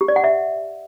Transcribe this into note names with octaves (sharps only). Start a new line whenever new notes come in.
G4
D5
F#5
E5